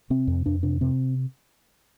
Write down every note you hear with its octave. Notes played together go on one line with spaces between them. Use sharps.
C3 C4
F2
F2 D4
C3 D4
C3 C4